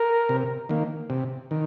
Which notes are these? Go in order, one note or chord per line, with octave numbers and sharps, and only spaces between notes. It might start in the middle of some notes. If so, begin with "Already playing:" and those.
Already playing: A#4
C3
D#3 A#3
C3
D#3